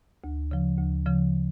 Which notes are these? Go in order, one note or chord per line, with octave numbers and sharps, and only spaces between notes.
D2
C#3 F3
D2
C#3 F3